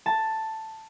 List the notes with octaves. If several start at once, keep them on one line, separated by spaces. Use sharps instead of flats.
A5